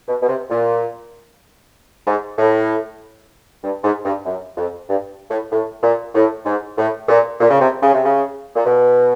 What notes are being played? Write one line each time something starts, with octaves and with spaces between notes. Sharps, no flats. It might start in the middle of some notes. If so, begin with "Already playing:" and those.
B2
B2
C3
A#2
G#2
A2
G2
G#2
G2
F#2
F2
G2
A2
A2
A#2
A2
G#2
A2
A#2
A#2
C#3
C3
C#3
C3
C#3
A#2
B2